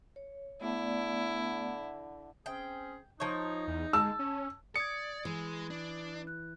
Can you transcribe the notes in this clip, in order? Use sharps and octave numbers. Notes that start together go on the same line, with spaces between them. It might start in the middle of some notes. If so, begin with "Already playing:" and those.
C#5
D3 A3 B3 E4 D5
C4 C#4 G#4 G5
F3 D#4 C#5
E2
G#3 A5 E6
C#4
D5 D#6 G#6 C#7
E3 G#3
D4
F#6